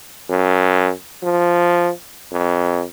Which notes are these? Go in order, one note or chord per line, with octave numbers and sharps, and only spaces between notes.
F#2
F3
F2